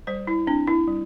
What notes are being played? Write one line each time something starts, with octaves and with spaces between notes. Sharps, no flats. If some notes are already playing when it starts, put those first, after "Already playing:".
G3 C5
E4
C4 D4
E4
G3